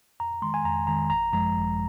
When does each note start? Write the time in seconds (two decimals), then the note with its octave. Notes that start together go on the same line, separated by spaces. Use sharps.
0.20 F2 A#5
0.42 D#3 G#3 C6
0.54 G#5
0.64 F2 A#5
0.87 D#3 G#3 A#5
1.10 G#1 A#5
1.33 F#2 F3 G#3 A#5
1.55 G#1